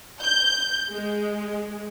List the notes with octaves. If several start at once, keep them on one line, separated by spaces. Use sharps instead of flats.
G6
G#3